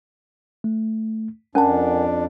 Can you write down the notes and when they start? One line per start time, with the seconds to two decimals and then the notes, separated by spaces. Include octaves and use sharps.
0.64 A3
1.55 F2 C#4 D4 A#4 F#5 G#5 A5